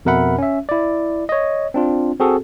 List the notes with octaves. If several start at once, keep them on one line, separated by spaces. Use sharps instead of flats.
F2 B2 A#4 E5 F#5 B5
C#4 E5
E4 D5
C#5 D#5
C4 D4 F4
C4 F#4 G#4 A4